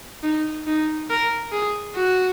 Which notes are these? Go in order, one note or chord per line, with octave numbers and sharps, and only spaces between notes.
D#4
D#4
A#4
G#4
F#4